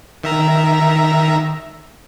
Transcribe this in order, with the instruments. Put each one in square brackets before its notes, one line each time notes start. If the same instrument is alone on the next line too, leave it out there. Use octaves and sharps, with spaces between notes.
[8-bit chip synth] D#3 E5 A#5